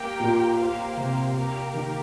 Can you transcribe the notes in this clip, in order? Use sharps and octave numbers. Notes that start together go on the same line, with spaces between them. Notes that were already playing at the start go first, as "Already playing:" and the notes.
Already playing: A#3 G4 A#4 G5
A#2
A#3 G4 C5 F5
C3
A#3 G4 A#4
D#3